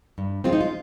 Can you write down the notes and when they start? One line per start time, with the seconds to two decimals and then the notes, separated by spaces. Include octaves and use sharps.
0.18 G2
0.44 F3 G#3 C4 F4
0.53 D#4
0.61 F4